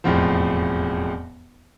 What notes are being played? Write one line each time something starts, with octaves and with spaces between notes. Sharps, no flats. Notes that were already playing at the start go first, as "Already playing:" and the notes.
E1 F2 A2 F3